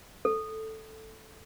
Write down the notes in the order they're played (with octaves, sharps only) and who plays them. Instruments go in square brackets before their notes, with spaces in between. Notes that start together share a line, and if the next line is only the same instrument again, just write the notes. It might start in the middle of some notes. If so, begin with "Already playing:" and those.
[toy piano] A4